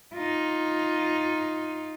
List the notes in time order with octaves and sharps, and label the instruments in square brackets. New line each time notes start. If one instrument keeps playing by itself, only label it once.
[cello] D#4 F4